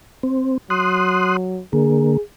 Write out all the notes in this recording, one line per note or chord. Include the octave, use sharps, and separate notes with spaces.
C4
F#3 C6 D#6 F#6
D3 A#3 G#4